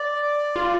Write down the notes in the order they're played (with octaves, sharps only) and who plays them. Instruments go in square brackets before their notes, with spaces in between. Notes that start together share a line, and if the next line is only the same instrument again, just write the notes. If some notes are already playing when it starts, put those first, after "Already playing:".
Already playing: [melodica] D5
[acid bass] F4